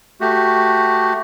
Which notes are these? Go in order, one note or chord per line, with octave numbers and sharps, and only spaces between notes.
A3 F#4 G4